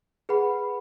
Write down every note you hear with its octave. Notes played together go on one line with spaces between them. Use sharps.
G#4 B4 F#5 B5